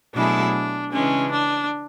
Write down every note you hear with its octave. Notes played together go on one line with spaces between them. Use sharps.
B2 F#3 A3 D4 E4 G#4
C#3 E3 G#3 C#4 D4
D4